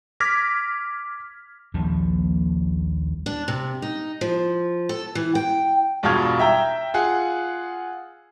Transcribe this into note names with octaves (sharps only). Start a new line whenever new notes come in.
D6 F6 G#6 A#6 B6
A#1 D#2 F3 G3
D4
C3
D#4
F3
A4
E3
G5
E1 G2 B2 F4 F6 G#6
E5 G5 A#5 E6
F4 G#4 F#5